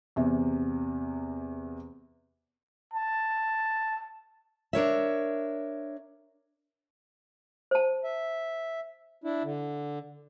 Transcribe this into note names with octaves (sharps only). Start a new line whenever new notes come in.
E2 C3
A5
D4 A#4 C#5 E5
C5 A5
E5
D4 E4
D3